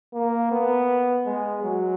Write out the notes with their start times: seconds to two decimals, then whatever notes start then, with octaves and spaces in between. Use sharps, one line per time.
0.14 A#3
0.51 B3
1.26 G#3
1.63 F#3